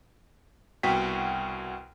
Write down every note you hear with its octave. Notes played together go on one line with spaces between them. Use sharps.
C2 B2 F#4 G5 B6